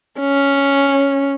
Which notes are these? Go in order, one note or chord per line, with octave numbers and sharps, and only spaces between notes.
C#4